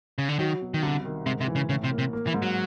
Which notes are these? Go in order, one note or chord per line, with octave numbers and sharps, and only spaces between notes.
C#3
D3
D#3 F#3
B2
D#3
C2 D3
D#3
G#2 C3
C3
E3
C#3
A2 C#3
C3
A#3
C3
A#3
E3
G#2
F#3